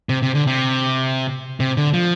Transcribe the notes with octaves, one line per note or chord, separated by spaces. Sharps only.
C3
C3
D3
C3
C3
D3
F3